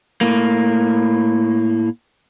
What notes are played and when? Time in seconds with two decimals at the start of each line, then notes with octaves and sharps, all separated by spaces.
0.21 A2 A#3